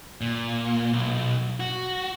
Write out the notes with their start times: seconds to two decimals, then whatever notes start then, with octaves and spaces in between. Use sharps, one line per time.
0.21 A#2
0.93 B1
1.60 F#4